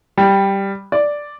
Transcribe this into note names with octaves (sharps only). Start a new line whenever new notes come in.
G3
D5